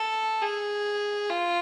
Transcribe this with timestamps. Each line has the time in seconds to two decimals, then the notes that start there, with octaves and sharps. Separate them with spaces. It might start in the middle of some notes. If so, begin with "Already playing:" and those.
Already playing: A4
0.42 G#4
1.30 F4